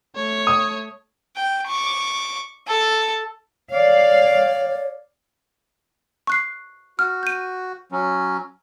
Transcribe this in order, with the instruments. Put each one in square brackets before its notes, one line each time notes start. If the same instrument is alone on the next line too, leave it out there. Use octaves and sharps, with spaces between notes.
[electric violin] A3 C#5
[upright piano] D#6
[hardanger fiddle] G5
C#6 D6
A4
[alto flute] C#5 [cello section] D5 F5
[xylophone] C#6 F#6 C7
[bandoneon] F#4 [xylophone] F6
[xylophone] G6 D#7
[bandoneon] F#3 C#4